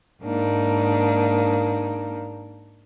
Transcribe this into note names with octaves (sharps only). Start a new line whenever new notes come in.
G#2 A#3 D4 D#4